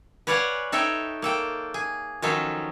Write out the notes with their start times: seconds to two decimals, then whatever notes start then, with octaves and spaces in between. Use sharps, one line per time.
0.27 B4 C#5 D5 F5 F#5 G#5
0.72 D#4 A4 C#5 E5 G5
1.22 A#3 A4 G5
1.74 G#4
2.22 D#3 F3 F#3 C#4 D#4 A4